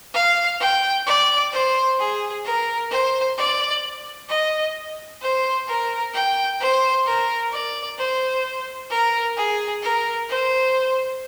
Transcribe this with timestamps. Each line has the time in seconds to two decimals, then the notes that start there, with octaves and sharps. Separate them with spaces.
0.14 F5
0.60 G5
1.06 D5
1.52 C5
1.99 G#4
2.45 A#4
2.91 C5
3.37 D5
4.29 D#5
5.21 C5
5.68 A#4
6.13 G5
6.60 C5
7.06 A#4
7.52 D5
7.98 C5
8.91 A#4
9.37 G#4
9.83 A#4
10.29 C5